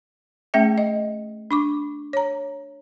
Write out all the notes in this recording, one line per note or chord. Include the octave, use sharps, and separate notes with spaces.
A3 C#4 G#4 E5 G5
D#5
D4 C#6 D6
C#5 A#5